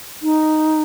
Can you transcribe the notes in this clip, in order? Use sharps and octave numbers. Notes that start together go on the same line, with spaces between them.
D#4